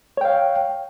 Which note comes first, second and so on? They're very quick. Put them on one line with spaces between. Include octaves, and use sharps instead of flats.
C#5 G5 F5